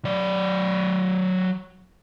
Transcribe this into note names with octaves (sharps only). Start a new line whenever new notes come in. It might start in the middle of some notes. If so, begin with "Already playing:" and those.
F#3 D5